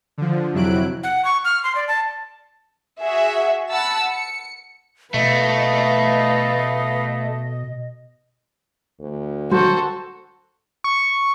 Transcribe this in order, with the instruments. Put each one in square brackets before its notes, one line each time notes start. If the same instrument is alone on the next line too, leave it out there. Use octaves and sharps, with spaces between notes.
[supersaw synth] D3 F3
F2 C3 F#3 E4 F#6 D7
[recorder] F#5
C#6
F6
C6
D5
A5
[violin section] F#4 G#4 E5
F#5 A5 B5 E6
C#7
[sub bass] B2 [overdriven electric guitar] A3 [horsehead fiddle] B4 F5 [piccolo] D#5
[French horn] D2
[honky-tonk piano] F#3 [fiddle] F#4 A4 [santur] C5
[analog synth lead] C#6